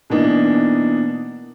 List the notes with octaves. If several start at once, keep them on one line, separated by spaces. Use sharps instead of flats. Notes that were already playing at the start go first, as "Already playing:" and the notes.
B2 E3 A#3 D4 D#4